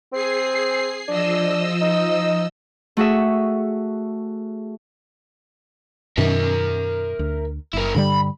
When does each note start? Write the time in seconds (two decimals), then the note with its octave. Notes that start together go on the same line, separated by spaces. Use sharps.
0.13 C4 G#4 C7
1.08 F3 D4 D#5 E6
1.81 D#4
2.97 A3 F#4 G#4 E5
6.18 F#2 B2 D#3 A#4 E5
7.19 D2
7.73 F#1 E4 A#4
7.95 G2 D3 G3 B5